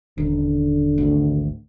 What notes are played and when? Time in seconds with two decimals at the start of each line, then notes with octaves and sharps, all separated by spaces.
0.18 D#1 D3
0.98 G#1 D2